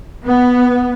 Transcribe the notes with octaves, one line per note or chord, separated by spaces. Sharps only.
B3